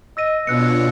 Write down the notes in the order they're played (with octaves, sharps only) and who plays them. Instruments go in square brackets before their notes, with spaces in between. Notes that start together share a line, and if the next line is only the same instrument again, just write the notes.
[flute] D#5 [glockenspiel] E6 A#6 D#7
[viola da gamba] B2 [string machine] D4 F4 C#5 [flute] B4 [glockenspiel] E6 F#6 C#7